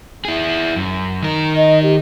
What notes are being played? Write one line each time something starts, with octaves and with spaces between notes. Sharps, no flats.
E4 G#4
F#2
D#3 A#4
D#5
G4